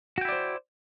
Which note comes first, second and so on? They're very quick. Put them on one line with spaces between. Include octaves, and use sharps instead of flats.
F#4 G5 E4 D5 C5